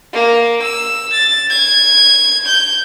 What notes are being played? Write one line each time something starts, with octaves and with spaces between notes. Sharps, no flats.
A#3
E6
A6
G#6
G6